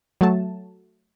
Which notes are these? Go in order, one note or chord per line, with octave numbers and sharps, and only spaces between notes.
F#3 A3 A5